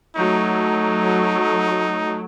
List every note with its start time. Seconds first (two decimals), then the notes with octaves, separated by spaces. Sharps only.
0.16 F#3 A3 D#4